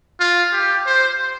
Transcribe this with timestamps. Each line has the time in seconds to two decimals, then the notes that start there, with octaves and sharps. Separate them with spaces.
0.20 F4
0.52 G4
0.86 C5